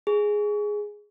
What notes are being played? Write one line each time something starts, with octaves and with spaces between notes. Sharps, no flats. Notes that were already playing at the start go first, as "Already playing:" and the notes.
G#4